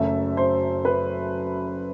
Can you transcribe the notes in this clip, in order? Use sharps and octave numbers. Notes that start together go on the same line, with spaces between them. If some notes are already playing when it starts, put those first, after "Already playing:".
Already playing: F#1 F#2 F#3 A3 E5
C5
B4